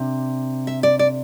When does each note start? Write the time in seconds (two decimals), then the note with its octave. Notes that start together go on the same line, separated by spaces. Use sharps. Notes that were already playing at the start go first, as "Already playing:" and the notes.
Already playing: C3 D4
0.67 E5
0.83 D5
0.99 D5